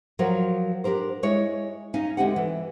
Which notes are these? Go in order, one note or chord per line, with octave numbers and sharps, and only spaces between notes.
F3 F#3 A#4 C5 C#5
D4 G4 A#4 C5
G#3 E4 C#5
C#4 D#4 F5
D2 F#3 G#3 C4 G4 F#5
E3